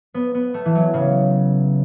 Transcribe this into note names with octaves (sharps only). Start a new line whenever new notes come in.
B3
B3
A3
E3
F#3
C#3